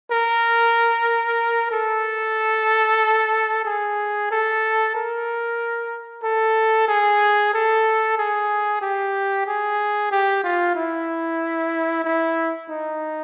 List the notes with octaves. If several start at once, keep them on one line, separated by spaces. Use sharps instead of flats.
A#4
A4
G#4
A4
A#4
A4
G#4
A4
G#4
G4
G#4
G4
F4
E4
E4
D#4